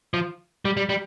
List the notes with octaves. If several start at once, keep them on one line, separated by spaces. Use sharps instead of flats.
F3
G3
G3
G3